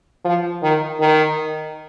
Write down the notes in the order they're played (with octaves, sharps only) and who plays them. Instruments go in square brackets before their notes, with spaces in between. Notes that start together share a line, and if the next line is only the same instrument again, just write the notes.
[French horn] F3
D#3
D#3